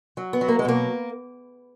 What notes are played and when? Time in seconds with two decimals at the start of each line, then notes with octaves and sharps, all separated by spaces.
0.17 F#3
0.33 B3
0.41 F#3
0.48 A#3
0.59 G#3
0.65 B2 A#3